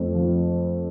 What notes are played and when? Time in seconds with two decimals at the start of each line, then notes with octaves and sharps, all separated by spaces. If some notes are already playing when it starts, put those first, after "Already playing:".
Already playing: F2 A3
0.15 F3